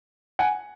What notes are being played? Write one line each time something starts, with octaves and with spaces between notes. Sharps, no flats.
F#5 G#5